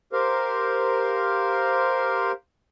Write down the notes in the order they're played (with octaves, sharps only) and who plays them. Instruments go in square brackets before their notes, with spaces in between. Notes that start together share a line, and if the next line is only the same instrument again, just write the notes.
[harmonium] G4 A#4 C5 F5